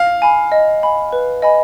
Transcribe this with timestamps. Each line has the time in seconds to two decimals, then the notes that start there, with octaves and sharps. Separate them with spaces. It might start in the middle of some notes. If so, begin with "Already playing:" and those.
Already playing: F5
0.22 G#5 B5
0.52 D#5
0.83 G#5 B5
1.13 B4
1.42 D#5 G#5 B5